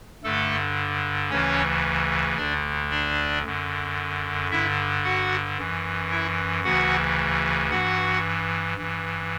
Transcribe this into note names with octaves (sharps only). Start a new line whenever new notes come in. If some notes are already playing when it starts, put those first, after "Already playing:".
G2 D3 A3 A4
D2 C#3 E3 C#4 C#5
D2 D3 D4 D5
D4 D5
F#2 D3
G2 D3 E4 E5
F#4 F#5
F#2 E3
E4 E5
D2 C#3 E3 F#4 F#5
G2 E3 F#4 F#5
G2 E3